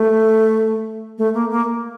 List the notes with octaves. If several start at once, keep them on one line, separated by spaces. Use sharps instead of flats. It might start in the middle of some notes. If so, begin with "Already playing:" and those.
Already playing: A3
A3
A#3
A#3